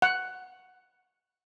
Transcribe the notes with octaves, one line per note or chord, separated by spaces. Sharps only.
F#5